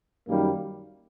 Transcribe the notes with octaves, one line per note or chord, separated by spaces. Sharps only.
F#2 D#3 G3 A#3